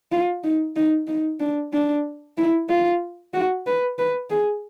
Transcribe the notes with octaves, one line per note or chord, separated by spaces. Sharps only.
F4
D#4
D#4
D#4
D4
D4
E4
F4
F#4
B4
B4
G#4